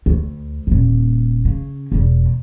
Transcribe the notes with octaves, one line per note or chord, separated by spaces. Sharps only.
D2
D#1 A#3
C#3
E1 E2